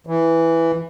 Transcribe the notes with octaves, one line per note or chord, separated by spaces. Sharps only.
E3